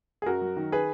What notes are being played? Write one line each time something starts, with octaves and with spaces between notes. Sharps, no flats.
G#4
F#2 F#4 A#4
F#3
D#3
G#4 B4